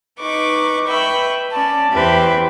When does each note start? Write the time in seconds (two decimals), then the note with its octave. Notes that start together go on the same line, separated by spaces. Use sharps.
0.20 D#4 B4 C#6 D6
0.87 B4 E5 G5 B5 C#6
1.52 C#4 D5 A5
1.91 E2 E3 G4 B4 C5 E5